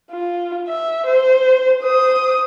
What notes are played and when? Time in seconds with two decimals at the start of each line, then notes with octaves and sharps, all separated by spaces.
0.11 F4
0.68 E5
1.06 C5
1.82 C5 D#6